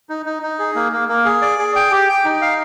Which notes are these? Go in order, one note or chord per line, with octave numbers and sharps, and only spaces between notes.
D#4
D#4
D#4
G#4
A#3
A#3
A#3
G#4
D5
G#4
G5
G4
G5
D#4
F5